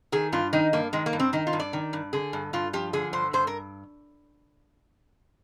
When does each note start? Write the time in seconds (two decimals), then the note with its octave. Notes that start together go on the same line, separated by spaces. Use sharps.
0.12 D#3 G#4
0.32 G2 F4
0.53 D#3 D#4
0.73 G2 A#3
0.93 D#3 G#3
1.06 A#3
1.13 G2
1.20 C4
1.33 D#3 D#4
1.47 F4
1.53 G2
1.60 D5
1.73 D#3
1.93 G2
2.13 D3 G#4
2.33 G2
2.53 G2 F4
2.73 F3 G4
2.93 D3 G#4
3.13 G2 C5
3.33 G2 C5
3.47 A#4